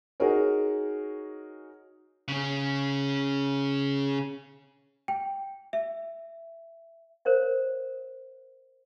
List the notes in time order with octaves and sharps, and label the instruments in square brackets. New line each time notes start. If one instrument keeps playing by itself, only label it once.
[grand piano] D#4 F#4 G#4 A#4 C#5
[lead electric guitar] C#3 C#4
[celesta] G5
E5
[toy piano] A#4 C5 C#5 F5